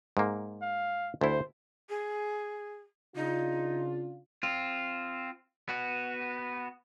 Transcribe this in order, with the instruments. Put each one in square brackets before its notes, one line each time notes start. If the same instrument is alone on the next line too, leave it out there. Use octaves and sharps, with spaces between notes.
[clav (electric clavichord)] G#2 A#3
[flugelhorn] F5
[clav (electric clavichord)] D2 E4 [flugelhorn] C5
[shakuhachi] G#4
[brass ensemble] C#3 D4 F4 [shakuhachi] D#4
[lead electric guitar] C4 F4
B3 F#4